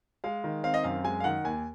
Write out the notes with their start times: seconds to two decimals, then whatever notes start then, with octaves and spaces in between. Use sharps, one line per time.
0.24 G#3 F5
0.44 D#3
0.64 C4 F5
0.74 D#5
0.84 F#2 F5
1.04 G#3 G#5
1.20 F5
1.24 D#3 F#5
1.44 D#2 G#5